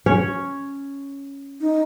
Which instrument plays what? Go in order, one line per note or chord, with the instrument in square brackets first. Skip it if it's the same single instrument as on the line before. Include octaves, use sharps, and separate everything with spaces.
[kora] C#4 C#5
[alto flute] D#4